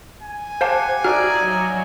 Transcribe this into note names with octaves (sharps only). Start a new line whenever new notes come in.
G#5
G4 C5 F5 F#5 A5
D#4 F#4 D5 E5 A#5 F6
F#3